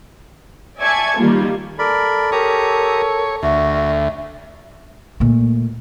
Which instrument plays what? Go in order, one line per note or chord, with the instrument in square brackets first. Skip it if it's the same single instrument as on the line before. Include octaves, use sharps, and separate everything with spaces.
[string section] D5 E5 G#5 A5 C#6 G#6
D#3 G3 A#3 F4
[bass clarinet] A4 [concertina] A#4 D5 B5
[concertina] G4 A#5 D#6 [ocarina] A#4 [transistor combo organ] C#5
[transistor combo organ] D2 [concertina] F#4 [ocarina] E5
[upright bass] A#2 A3